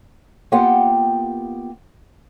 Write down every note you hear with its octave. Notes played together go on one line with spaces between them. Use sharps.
A#3 B3 F4 G4 F#5 G5